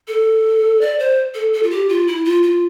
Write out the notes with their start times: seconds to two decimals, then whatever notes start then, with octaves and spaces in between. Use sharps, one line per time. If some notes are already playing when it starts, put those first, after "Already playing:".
0.08 A4
0.81 D5
0.99 C5
1.34 A4
1.53 A4
1.63 F4
1.71 G4
1.89 F4
2.07 E4
2.25 F4
2.43 F4